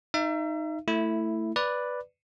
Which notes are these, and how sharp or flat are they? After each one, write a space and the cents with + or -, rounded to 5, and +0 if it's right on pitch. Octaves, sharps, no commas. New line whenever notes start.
D#4 +0 E5 +35
A3 +15 E4 +0
B4 +0 D5 +0